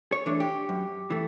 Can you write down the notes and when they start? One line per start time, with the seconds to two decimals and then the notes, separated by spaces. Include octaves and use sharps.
0.12 C#5
0.26 E3 A3 D4
0.40 G4
0.69 F#2
1.10 E3 A3